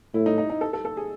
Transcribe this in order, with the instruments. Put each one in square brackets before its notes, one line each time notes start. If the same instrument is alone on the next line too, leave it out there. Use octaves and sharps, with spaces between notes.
[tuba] A2 [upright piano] E4
[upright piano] D#4
D#4
D#4
A4
A4
A4
G#4